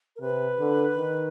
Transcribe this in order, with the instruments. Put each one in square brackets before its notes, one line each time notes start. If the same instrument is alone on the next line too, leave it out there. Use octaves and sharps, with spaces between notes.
[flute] A#4
[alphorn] C3 [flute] B4
[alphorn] D3
D#3